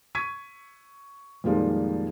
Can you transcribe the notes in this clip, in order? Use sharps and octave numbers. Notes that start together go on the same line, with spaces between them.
C#6 G#6 B6 D#7
F2 A#2 D#3 F3 G3 G#3